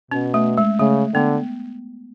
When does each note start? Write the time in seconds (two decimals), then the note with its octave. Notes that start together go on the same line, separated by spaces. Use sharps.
0.11 B2 C#4
0.34 A3
0.58 G#3
0.79 C#3 A3
1.14 D3 B3